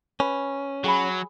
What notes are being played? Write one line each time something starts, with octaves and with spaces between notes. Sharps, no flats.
C#4 B4
F#3 G#4 G#5 B5